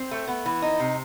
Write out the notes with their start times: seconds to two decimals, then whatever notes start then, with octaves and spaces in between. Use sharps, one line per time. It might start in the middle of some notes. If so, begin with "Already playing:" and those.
Already playing: C4
0.11 A3
0.28 B3
0.46 E3
0.62 D#4
0.80 C3